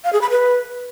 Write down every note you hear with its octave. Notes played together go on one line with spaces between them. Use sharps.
F5
G#4
B5
B4